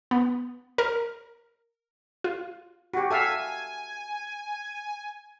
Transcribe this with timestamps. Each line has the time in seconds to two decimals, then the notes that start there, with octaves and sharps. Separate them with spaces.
0.11 B3
0.78 A#4
2.24 F4
2.94 F#4 G4
3.11 A4 E5 F5 G#5